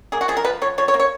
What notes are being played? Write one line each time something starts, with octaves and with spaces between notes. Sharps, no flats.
A#3 G#4
F#4
F3 G#4
A#4
F3 B4
F3 C#5
F3 C#5
C#5
A#3
C#5